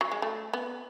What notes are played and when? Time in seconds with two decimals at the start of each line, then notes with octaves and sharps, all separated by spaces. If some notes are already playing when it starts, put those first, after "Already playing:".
0.01 F#3
0.12 G#3
0.22 A3
0.53 B3